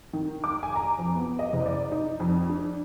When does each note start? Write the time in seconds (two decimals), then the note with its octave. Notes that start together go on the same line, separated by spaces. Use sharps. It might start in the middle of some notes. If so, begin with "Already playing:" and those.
0.13 D#3
0.44 D6
0.63 G#5
0.75 A#5
0.98 F2
1.15 B3
1.39 D#5
1.53 F#1
1.66 D5
1.91 D#4
2.20 F2
2.49 D4